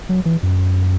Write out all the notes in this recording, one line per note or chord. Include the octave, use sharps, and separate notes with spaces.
F#3
E3
F#2